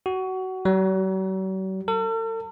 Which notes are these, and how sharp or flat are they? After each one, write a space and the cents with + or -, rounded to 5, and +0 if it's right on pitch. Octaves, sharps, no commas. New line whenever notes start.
F#4 +20
F#3 +45
A4 +45